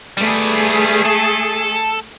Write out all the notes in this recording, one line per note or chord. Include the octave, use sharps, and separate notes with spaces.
G3 A3 B3 G#4
A4